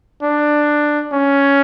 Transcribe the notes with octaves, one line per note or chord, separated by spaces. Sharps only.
D4
C#4